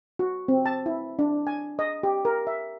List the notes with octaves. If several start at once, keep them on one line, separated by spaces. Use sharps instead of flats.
F#4
C4
A5
E4
D4
G#5
D#5
G4
A#4
E5